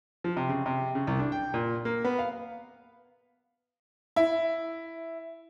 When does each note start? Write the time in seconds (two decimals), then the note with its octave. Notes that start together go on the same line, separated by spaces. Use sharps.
0.24 F3
0.37 C3
0.49 C#3
0.66 C3
0.95 C#3
1.07 C2
1.19 D4
1.32 G5
1.54 A#2
1.85 A#3
2.05 B3
2.19 F5
4.16 E4